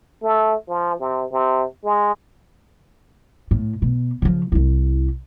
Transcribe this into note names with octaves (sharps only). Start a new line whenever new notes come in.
A3
F3
C3
C3
G#3
A2
B2
C#3 F3
C2 E4